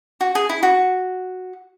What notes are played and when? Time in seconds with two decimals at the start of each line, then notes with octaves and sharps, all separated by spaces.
0.21 F#4
0.35 G#4
0.49 E4
0.63 F#4